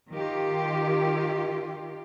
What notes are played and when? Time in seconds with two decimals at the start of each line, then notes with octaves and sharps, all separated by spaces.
0.14 D#3 F4 G4